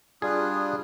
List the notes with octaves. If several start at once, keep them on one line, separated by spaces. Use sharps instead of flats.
G3 D4 F4 G#4 D#6 F6 F#6